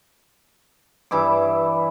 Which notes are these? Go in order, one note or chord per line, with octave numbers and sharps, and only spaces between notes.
G2 E3 E4 D6